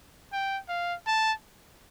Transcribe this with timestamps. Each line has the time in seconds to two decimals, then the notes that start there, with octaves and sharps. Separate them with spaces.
0.32 G5
0.68 F5
1.06 A5